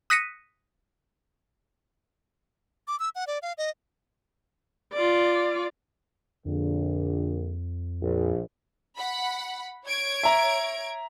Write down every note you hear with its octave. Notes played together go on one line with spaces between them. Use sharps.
D#6 F#6 A#6 B6 C#7 D#7
D6
E6
F#5
D5
F5
D#5
F4 D5
A#1 F2 D3
A#1
F#5 B5
C#5 G#6 D7
E5 A#5